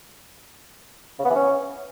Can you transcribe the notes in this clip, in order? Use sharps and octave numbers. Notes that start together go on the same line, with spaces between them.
C#3
B3
E3
C#4